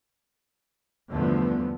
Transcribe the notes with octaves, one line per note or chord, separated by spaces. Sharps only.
E2 G2 D3 F3 A3 B3